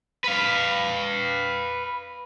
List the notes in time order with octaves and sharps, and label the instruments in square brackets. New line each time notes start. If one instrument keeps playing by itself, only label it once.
[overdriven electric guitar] B4 F5